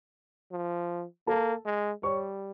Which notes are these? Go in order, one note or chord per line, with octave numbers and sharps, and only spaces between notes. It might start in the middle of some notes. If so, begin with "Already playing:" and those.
F3
A#3 A4 A5
G#3
G3 C#5 C#6